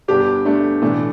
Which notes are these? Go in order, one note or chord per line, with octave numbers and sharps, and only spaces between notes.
G1 G2 D3 D4 G4
A3 D4
B1 A2 E3 A3 D4